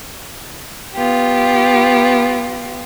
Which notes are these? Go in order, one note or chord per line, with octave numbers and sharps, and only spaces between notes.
B3 F4 G4